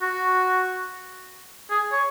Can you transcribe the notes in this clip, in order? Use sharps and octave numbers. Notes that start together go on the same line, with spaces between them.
F#4
G#4
C#5